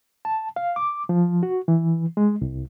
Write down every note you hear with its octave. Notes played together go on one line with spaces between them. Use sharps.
A5
F5
D6
F3
F#4
E3
G#3
C2